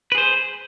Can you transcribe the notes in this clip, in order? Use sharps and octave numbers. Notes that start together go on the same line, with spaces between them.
G#4 B4 C5